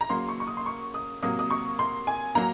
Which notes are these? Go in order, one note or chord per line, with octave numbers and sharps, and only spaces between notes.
A#5
C#3 F#3 A#3 C6
C#6
C#6
D#6
C6
C#6
D#6
C3 F#3 A#3 D#6
D#6
C#6
C6
G#5
F#3 A#3 A#5